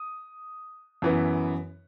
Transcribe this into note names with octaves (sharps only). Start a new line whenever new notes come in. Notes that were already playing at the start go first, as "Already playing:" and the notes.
Already playing: D#6
F#2 E3 B3